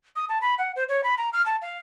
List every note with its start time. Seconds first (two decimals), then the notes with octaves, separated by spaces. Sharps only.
0.16 D#6
0.29 A5
0.41 B5
0.58 F#5
0.76 C5
0.89 C#5
1.04 B5
1.18 A#5
1.33 F6
1.46 A5
1.62 F5